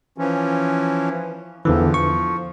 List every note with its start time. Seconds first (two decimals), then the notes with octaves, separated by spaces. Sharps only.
0.18 E3 F3 C#4
1.65 E2 D3 E3 F3
1.94 C#6